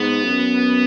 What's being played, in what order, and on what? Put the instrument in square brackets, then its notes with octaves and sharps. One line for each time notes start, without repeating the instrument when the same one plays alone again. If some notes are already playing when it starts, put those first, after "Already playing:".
Already playing: [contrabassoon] G#2 [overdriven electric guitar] B3
[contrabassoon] F#2